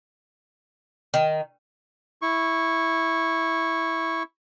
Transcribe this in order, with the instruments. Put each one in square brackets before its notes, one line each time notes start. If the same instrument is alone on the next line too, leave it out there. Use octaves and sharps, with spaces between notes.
[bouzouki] D#3
[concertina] E4 C#6